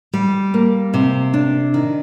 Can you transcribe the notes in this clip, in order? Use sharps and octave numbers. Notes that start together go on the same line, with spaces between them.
G3
A#3
C3
D4
D#3